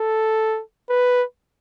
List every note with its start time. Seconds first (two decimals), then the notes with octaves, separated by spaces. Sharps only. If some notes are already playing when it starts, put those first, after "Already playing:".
Already playing: A4
0.90 B4